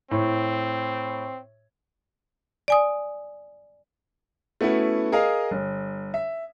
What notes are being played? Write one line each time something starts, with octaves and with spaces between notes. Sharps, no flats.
A2 C4
D5 G#5 D#6
A3 B3 C#4 E4 F#4
G#4 A#4 D#5 F5
G1
E5